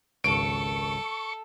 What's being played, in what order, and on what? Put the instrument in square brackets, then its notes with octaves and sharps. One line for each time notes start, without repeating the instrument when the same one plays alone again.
[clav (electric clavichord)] G#1 C#2 [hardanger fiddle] A4 [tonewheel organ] C#6 [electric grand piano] D7